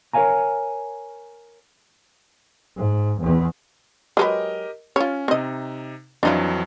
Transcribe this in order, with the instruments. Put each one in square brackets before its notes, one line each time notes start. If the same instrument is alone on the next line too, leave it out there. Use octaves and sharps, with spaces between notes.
[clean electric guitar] A#4 C#5 D5 F5 G#5 A#5
[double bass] G#2
E2
[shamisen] F#3 G#3 B4 [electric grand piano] G4 A#4 D#5
[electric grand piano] C#4 [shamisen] F4 C#5
[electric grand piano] C3 D#4 [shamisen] C4 D#5
[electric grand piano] F2 E3 F#3 [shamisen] D4 D#4 F4